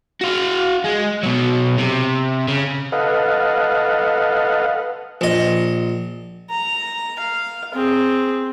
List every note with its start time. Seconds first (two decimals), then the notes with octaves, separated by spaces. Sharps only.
0.21 F#4 F5
0.85 G#3
1.23 B2 F#3
1.78 C3
2.48 C#3
2.92 A4 B4 D#5 F5 F#5
5.21 A#1 D#5
6.50 A#5
7.19 F5
7.74 C4 G#4